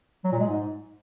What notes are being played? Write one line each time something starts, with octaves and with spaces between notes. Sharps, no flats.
F#3
A#2
G#3
G#2